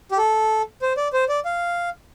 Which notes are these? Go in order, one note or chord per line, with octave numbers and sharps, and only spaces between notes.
G4
A4
C5
D5
C5
D5
F5